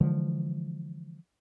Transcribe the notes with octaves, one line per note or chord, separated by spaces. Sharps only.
D3 E3 F3 G#3